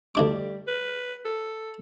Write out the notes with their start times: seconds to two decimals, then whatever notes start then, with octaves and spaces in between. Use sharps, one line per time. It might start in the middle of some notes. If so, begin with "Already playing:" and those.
0.15 D2 G3 D4 D6
0.67 B4
1.25 A4